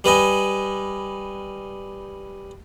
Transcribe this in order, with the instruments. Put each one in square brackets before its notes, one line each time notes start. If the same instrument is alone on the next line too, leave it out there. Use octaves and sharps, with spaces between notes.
[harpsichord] G3 B4 D#5 G#5